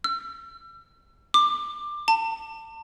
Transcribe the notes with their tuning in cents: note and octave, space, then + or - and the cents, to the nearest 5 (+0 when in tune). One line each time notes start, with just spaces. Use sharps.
E6 +40
D6 +20
A5 +35